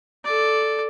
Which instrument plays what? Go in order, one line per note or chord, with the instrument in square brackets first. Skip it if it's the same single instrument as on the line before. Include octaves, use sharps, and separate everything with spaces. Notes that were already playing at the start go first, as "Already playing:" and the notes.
[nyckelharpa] A4 D5